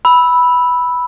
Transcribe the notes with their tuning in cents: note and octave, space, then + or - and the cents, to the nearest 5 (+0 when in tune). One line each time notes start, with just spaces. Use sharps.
B5 -5 E6 -10